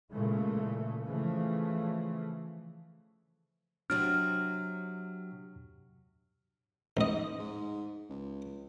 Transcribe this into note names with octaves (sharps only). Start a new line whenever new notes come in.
A#2 C#3 E3 G#3 A3
C#3 E3 F3 A3
C3 F#3 C4 D4 F6
A1 G#2 D#5
G#2
C#2